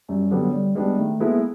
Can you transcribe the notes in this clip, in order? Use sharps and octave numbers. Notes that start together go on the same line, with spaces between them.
F#2 G3
D3 F#3 G3 B3
D3 G3
G3 G#3 B3 D4
D#3 A3
G#3 A#3 B3 E4 A4